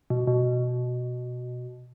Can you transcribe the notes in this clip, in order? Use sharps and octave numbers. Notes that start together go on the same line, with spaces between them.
B2
B2